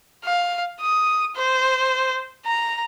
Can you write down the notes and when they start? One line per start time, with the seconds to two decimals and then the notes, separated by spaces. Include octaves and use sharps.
0.25 F5
0.81 D#6
1.36 C5
2.46 A#5